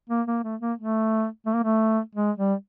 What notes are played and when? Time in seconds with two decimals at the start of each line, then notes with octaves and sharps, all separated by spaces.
0.10 A#3
0.27 A#3
0.44 A3
0.61 A#3
0.78 A3
1.46 A3
1.55 A#3
1.63 A3
2.15 G#3
2.38 G3